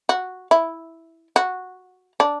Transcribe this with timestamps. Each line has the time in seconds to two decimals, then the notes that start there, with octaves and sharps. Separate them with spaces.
0.09 F#4
0.51 E4
1.36 F#4
2.20 D4